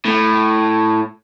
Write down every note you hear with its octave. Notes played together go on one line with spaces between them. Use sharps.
A2